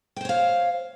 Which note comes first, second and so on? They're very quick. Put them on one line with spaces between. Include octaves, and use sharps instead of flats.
G5 C5 C#5 F5